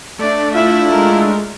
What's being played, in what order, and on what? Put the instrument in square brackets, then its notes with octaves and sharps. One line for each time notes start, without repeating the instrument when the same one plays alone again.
[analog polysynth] A3 D4 [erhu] D5
[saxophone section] E4 F4 [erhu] E5
[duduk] G#3 [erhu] A#4